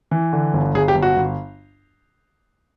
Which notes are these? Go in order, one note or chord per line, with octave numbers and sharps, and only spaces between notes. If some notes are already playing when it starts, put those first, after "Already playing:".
E3
D3
G1
G1 G#4
G4
G1
F#4
G1